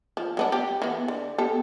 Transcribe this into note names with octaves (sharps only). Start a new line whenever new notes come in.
F3
F#3 B3 D4
G4
E3 B3
D3
B3 G4 A4